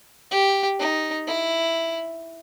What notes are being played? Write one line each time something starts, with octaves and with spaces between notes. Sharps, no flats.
G4
D#4
E4